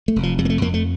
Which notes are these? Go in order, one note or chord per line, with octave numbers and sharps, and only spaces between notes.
A3
F1
F3
F2 G3
A#3
A3
F2 A#3
A3